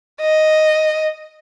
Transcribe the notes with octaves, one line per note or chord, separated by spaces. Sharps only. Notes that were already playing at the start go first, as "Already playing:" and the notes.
D#5